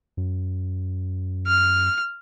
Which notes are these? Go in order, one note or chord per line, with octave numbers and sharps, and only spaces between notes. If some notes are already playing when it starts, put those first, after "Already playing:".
F#2
F6